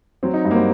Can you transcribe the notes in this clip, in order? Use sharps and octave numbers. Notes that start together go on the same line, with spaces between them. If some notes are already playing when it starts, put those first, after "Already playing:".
F#3 C4
D#4
G2 F#4
A#3
C4